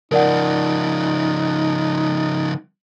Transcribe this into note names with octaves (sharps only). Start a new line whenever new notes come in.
C#3 F3 D#4 A#4 D5 F#5